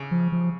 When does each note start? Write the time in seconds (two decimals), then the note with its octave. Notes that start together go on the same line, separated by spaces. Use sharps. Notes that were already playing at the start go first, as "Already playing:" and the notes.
Already playing: C#3
0.11 F3
0.32 F3